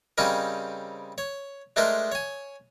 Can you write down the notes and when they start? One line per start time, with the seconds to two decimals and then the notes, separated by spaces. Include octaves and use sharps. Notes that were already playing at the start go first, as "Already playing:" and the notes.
0.18 C#3 G3 C4 C#4 D#4 A#4
1.18 C#5
1.76 G#3 A3 D4 D#4 A#4 C5
2.12 C#5 G#5